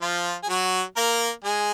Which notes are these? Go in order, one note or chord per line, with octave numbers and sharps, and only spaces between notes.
F3 F4
G#4
F#3 F#4
A#3 A#4
G#3 G#4